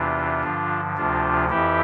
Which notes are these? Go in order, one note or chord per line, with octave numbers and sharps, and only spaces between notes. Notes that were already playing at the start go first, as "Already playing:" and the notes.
Already playing: E2 C3 E3 D4 F4
G2 D3 F3
D2 C3 F3 D4 F4
F2 E3 E4 G4